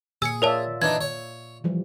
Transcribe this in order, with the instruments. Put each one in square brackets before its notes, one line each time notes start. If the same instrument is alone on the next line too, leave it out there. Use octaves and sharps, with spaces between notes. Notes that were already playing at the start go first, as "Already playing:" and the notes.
[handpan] A#2 [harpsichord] G#4 [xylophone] E6 C#7
[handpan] F4 D5 E5 [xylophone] A#4 C#5 A5
[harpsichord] E3 D4 D#4 [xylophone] G#6
[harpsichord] C#5
[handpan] E3 F3 G3